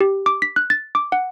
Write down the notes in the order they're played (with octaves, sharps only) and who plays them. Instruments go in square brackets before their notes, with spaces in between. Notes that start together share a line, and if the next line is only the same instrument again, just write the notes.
[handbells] G4
D6
B6
F#6
A6
D6
F#5